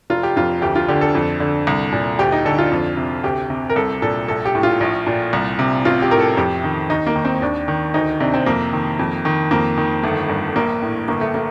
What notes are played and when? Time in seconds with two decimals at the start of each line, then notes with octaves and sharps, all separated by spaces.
0.10 F1 F4
0.23 G4
0.36 F2 F4
0.62 D2 G4
0.75 F4
0.88 D3 G4
1.01 A4
1.15 F2
1.40 D3
1.67 C2
1.92 A#2
2.19 D2 G4
2.32 D#4
2.45 D3 A4
2.58 F4
2.72 F2
2.97 C3
3.24 D2 G4
3.50 C3
3.70 A#4
3.76 C2 A4
4.02 A#2 A4
4.28 A#1 A4
4.46 G4
4.55 A2
4.63 F4
4.80 A#1
5.07 A#2
5.33 C2
5.59 C3
5.85 A1 F4
6.02 G4
6.11 A2 A#4
6.20 A4
6.37 F2 G4
6.64 D#3
6.89 D#2 D#4
7.07 A#3
7.16 D#3
7.25 C4
7.42 D#2 D4
7.68 D#3
7.94 D2 D#4
8.20 C3 D4
8.34 C4
8.46 F2 A#3
8.73 D#3
8.99 F2
9.25 D#3
9.51 F2 A#3
9.78 D#3
10.03 G1 A3
10.29 G2
10.56 A#1 A#3
10.82 A2
11.08 G1 A#3
11.21 A3
11.34 A#3